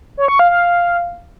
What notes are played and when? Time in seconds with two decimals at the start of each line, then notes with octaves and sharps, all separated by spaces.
0.17 C#5
0.28 C#6
0.39 F5
0.50 F5